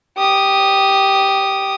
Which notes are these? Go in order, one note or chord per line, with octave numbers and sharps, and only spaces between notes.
G4 D#6